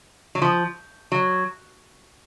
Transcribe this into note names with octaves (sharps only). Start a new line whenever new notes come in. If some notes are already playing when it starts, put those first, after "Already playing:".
F#3
F3
F#3